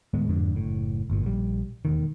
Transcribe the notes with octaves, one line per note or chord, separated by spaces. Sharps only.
D#2 A2 G#3 B3
F2 G#2 D3 D4
F#1 A2
G1 A#2
A#1 G3
E1 D#2 D#3